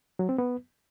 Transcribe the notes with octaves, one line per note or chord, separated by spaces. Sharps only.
F#3
C4
B3